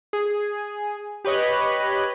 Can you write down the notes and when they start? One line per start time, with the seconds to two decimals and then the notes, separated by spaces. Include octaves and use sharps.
0.13 G#4
1.25 G4 B4 C#5 D#5 B5